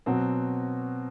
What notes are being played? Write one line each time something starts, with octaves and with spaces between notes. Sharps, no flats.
B2 F#3 C4